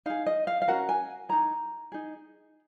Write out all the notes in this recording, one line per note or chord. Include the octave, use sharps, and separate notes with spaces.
D#4 G#4 F5
D#5
F5
F5
C#4 F#4 A#4 F#5
G#5
D#4 G#4 A#5
D#4 G#4